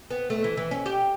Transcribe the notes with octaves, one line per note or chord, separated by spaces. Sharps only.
B3
A3
E3
E3
C#4
G4